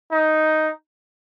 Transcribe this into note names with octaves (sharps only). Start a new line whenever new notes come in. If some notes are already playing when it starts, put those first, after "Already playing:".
D#4